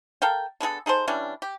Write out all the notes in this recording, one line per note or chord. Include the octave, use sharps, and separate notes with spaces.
A4 A#4 F5 G5
D3 B3 G#4 A4
D#4 G#4 A4 C5
E3 G3 C#4 D4
G4